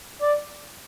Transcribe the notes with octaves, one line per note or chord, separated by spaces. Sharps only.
D5